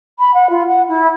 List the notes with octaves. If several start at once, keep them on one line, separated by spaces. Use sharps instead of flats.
B5
F#5
F4
F#5
E4